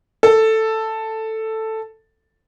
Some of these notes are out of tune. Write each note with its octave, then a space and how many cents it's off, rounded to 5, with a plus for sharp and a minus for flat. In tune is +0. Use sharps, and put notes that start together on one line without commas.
A4 +5